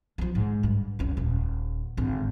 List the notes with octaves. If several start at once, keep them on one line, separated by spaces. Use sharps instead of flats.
F3 G#3
G#2
G2
F1 C#2
D#1
G#1 D3